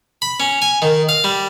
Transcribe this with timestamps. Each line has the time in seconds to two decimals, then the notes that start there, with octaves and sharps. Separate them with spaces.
0.22 B5
0.40 C#4
0.62 G#5
0.82 D#3
1.09 F5
1.24 G3